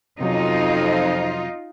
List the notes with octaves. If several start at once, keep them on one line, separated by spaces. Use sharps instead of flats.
F2 C3 F#3 C#4 D#4 F4